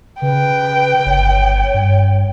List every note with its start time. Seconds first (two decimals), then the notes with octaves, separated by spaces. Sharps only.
0.22 C#3 B4 G5
1.06 G1 C#5
1.74 G2